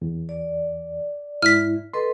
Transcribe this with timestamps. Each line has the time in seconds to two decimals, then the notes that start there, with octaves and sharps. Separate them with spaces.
0.02 E2
0.29 D5
1.42 G#2 E4 F6 B6
1.93 A4 B4 D#5 C6